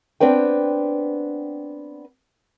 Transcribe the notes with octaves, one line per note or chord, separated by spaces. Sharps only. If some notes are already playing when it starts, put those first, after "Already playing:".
B3 C4 D4 B4 G5